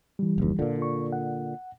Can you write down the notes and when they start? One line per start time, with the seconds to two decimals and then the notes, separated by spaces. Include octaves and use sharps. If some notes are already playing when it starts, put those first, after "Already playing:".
0.19 E3 G3
0.38 F#1 D#2
0.59 A#2 D3 F4
0.82 C#6
1.13 F#5